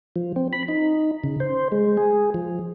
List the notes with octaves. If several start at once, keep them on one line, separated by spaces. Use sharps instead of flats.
F3
C4
B5
D#4
C#3
C5
G#3
G#4
F3